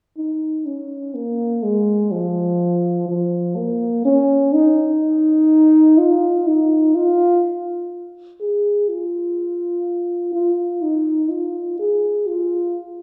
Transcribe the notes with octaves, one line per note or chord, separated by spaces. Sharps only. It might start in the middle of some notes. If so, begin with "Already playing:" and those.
D#4
C#4
A#3
G#3
F3
F3
A#3
C#4
D#4
F4
D#4
F4
G#4
F4
F4
D#4
F4
G#4
F4